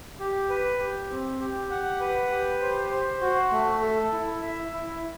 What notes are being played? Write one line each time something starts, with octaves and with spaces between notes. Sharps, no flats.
G4
B4
G4
C4
G4
F#5
B4
G4
C5
C5
F#4
A3
A4
E4
E5
E4